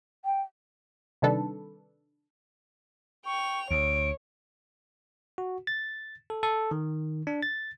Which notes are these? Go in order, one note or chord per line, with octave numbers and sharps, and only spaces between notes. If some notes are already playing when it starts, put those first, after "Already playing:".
G5
C3 D#3 G3 D4 A4 B4
G5 C#6 F7
D2 C#5 D7
F#4
A6
A4
A4
D#3
D4
A6